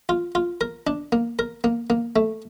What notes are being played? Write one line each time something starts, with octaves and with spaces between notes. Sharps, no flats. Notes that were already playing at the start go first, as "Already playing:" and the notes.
F4
F4
A#4
D4
A#3
A#4
A#3
A#3
A3